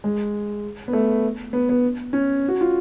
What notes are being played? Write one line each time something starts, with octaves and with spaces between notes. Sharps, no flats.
G#3
B3
A3
B3
B3
C#4
F#4
F4